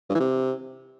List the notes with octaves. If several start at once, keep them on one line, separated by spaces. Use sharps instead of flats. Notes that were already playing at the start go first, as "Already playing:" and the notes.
G2
E3
C3